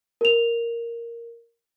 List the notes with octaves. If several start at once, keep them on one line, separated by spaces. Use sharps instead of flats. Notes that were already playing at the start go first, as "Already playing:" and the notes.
A#4 F7